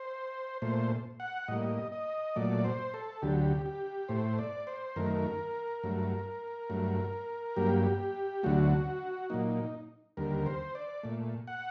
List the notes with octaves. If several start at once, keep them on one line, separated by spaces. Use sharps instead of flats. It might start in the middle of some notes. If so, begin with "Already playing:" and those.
Already playing: C5
A#2 A3 C5
F#5
A2 G3 A#3 D#5
D#5
A#2 F#3 A3 D5
C5
A4
D2 D3 F#3 G4
G4
A2 A3 C5
D5
C5
F#2 D#3 A3 A#4
G2 F#3 A3
G2 F#3 A3
G2 F#3 A#3 G4
D2 D3 F#3 A3 F#4
A#2 F#3 A#3 D#4
D#2 D3 G3 A#4
C5
D5
A#2 A3
F#5